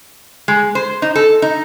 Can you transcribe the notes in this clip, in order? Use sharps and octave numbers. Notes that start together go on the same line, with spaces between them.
G#3
C5
D#4
A4
D#4